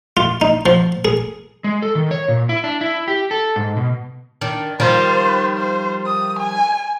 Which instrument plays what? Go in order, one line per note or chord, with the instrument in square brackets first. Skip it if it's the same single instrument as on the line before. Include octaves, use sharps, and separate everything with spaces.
[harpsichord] F4
D#4
F3
G#4
[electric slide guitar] G#3
A4
D#3
C#5
A#2
E4
D4
E4
G4
A4
G#2
B2
[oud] D#3 D4
[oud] D#3 F3 G3 [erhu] C5
[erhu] C5
D#6
G#5